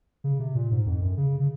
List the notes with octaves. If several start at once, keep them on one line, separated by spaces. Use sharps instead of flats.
C#3
C3
A#2
G#2
F2
F#2
C#3
C#3